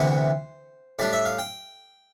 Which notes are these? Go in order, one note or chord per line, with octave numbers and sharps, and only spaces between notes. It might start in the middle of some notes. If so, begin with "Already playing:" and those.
Already playing: D2 C3 E3 B3 C5
A2 G3 D4 D5
E5
F5
G5